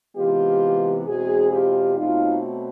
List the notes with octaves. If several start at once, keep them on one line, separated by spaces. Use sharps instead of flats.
C3 E3 G#3 B3 F4 G4
E2 B2 G#3 C4 F#4 G#4
F4 G4
B2 F#3 A3 C4 D#4 F4